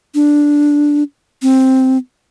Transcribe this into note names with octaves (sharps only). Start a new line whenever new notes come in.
D4
C4